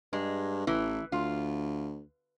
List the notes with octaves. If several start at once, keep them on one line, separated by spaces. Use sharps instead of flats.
G2 G#3
A1 E3
D2 F4